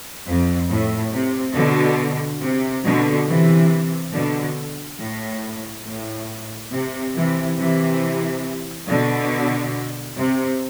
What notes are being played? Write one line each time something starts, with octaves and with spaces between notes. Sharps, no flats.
F2
A2
C3
B2 D3
C3
B2 D3
C3 E3
B2 D3
A2
A2
C3
C3 E3
C3 E3
B2 D3
C3